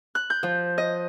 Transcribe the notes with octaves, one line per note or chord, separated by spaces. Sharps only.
F#6
G6
F3
D#5